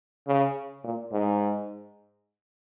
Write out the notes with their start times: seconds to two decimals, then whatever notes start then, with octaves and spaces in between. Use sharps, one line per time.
0.27 C#3
0.84 A#2
1.12 G#2